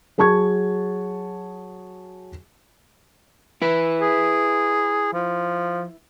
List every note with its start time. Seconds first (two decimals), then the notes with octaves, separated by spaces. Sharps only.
0.18 F#3 G#4 A5 C#6 G#6
3.62 E4 B4
4.01 G#4
5.13 F3